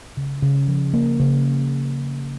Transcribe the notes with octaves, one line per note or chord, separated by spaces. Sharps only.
C#3
C#3
F3
A#3
C#3